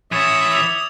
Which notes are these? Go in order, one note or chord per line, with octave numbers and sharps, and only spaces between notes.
E3 C#5 E5 D#6 G#6 A6
D6 E6 F7